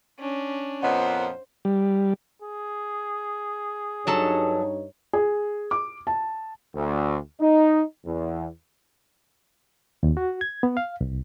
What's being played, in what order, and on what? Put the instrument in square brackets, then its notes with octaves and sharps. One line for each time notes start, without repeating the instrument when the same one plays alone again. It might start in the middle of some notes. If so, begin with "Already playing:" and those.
[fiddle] C#4 D4
[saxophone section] F2 A#2 B3 [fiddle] C5 [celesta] C#5 D#5 F#5
[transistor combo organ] G3
[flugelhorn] G#4
[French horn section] G2 D#4 C#5 [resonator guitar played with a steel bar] F#3 A4 A5
[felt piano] G#4
D6
A5
[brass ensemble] D2
D#4
E2
[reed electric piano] D#2
F#4
G#6
B3
F5
C2